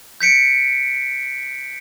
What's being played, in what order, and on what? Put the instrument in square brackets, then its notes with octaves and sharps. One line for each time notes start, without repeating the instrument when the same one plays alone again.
[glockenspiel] G6 B6 C#7 D7